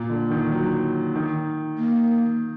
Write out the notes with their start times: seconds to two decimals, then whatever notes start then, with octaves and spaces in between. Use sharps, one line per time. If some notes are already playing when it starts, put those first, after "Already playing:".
Already playing: A#2
0.10 D3
0.31 D#3
0.52 F#3
1.15 D#3
1.78 A#3